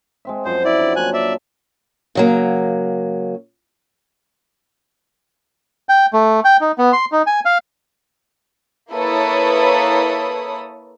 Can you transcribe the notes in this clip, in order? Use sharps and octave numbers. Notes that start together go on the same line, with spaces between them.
G#3 C4 E5
F#2 F3 F#3 C5
E4 D5
D3 A#5
F#3 A#3 G#5 A5 F#6
D5 E5
C#3 F#3 A#3
G5
A3
G5
D#4
B3
C6
D#4
G#5
F5
A#3 E4 A4 B4 C#5 D#6